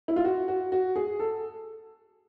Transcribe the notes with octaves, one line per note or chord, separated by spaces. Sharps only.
E4
F4
F#4
F#4
F#4
G#4
A4